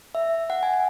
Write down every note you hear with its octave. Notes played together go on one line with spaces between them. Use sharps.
E5
F#5
G#5
G#5